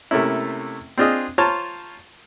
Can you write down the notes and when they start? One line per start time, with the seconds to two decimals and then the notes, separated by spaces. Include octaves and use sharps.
0.11 C3 A3 A#3 C#4 E4
0.98 C4 D4 F4 G#4 D#5
1.38 F4 C5 C#5 A5 A#5